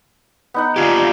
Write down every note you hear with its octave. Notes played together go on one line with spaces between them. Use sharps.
B3 D#4 F#5
A#3 D4 F4 G4 F5 G#5